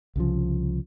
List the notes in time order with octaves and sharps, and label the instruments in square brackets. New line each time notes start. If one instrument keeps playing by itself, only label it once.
[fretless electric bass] C2 C#3 F3